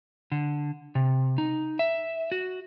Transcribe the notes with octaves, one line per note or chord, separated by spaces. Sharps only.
D3
C3
D#4
E5
F#4